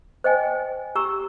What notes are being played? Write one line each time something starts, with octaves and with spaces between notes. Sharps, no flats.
C5 D#5 G5 G#5
G4 A#5 C#6 E6